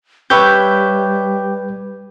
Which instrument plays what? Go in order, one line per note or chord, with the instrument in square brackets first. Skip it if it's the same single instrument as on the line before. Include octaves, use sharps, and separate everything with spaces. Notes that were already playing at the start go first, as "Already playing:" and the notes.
[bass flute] G3 [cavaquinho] G4 C#5 E5 [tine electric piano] B4 G6